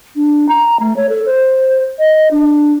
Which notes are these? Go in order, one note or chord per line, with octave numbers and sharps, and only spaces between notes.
D4
A#5
A3
C#5
A4
C5
D#5
D4